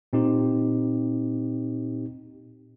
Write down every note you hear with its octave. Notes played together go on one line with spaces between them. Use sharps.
A#2 C4 D#4 G4